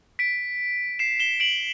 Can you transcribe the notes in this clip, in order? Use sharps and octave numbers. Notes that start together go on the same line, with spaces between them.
B6 D7
C7 E7
E7 G7
D7 F#7